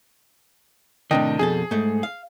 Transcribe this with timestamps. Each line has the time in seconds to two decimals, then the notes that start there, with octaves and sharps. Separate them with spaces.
1.11 A2 C3 D#3 D4 D#5 G5
1.39 F2 B2 G#4 A4
1.71 G#2 A3
2.03 F5